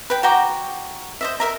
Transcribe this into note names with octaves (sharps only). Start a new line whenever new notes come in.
B4 G5
F#4 G5 A#5 D6
C5 D#5 E5
A#4 E5 A#5